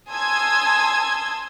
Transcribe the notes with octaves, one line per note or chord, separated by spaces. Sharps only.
G#5 A5 C6 D#6 E6 G#6